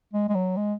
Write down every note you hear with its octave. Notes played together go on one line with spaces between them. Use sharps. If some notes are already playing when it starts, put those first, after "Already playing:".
G#3
G#3
F#3
G#3